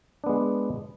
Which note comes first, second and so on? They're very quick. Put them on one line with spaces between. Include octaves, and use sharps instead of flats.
D4 B3 G#3